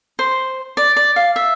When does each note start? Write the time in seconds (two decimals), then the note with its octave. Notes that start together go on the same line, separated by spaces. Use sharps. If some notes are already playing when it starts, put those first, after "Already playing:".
0.19 C5
0.77 D5
0.96 D5
1.16 F5
1.36 E5